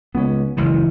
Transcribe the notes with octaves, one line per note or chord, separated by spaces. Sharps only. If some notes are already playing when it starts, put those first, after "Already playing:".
C#2 B3 C#4
F#1 C#2 D#3 E3